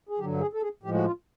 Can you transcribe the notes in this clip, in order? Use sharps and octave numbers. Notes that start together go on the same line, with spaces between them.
G#4
G2 D3 F#3 G4
G#4
A4
G#4
A2 F3 G#3 G4
F#4
F4